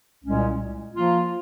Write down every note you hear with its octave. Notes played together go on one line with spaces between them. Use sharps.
C2 A#2 G#3 C#4
F3 A#3 F4